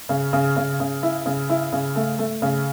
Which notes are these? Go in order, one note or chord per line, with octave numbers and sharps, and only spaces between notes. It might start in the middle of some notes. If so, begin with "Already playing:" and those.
C#3
C#3
C#3
C#3
E4
C#3
E4
C#3
A3
A3
C#3